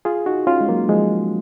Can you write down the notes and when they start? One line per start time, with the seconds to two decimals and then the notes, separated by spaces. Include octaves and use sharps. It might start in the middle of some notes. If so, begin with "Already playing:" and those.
0.05 F4 G#4
0.26 D#4 F#4
0.47 C#4 F4
0.61 G#3
0.69 F#3 A#3
0.89 F3 G#3